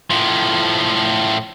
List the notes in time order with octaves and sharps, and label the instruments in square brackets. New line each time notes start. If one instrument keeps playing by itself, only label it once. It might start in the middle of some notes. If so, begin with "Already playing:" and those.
[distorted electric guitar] A2 F3